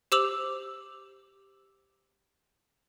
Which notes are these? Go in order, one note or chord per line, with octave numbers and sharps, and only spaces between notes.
G4 C5 D6 E6 F7 F#7